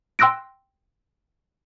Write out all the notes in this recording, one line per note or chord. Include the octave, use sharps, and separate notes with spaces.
G5 C6 E6 F#6 A#6 D7